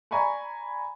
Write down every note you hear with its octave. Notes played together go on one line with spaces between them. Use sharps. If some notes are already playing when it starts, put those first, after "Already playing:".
D5 G#5 A#5 B5 C#6